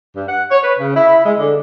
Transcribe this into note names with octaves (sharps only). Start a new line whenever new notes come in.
G2
F#5
C#5
B4
C#3
E4
G#3
D3